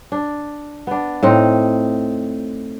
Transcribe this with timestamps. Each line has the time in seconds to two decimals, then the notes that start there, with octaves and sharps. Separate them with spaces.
0.12 D4
0.87 B3 D4
1.23 A2 C4 D#4